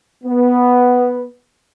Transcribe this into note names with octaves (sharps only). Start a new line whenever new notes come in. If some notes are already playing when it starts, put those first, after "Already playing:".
B3